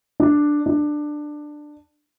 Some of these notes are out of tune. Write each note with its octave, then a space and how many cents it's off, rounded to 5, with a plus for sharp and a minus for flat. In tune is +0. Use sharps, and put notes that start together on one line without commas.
D4 +5
D4 +15